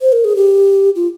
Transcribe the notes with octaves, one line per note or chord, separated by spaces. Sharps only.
C5
A#4
G#4
G4
F4